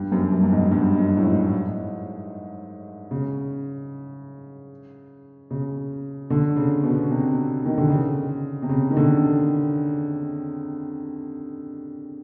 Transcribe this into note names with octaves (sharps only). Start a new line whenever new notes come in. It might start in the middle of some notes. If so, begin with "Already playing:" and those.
Already playing: G2
F#2
G2
G2
G#2
G2
F#2
A2
G#2
C#3
C#3
D3
C#3
B2
C3
D#3
D3
C#3
C3
C#3
D#3
D3